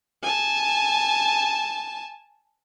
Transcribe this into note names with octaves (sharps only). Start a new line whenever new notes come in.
G#5 A5